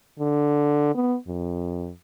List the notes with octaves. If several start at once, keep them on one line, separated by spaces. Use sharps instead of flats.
D3
B3
F2